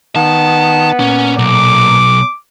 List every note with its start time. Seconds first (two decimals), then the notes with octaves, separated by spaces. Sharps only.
0.16 D#3 B3 A5
0.99 A#2 C#4
1.39 B1 D6